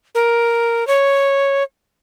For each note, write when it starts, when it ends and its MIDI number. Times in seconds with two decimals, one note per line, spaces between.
0.15 0.87 70
0.87 1.63 73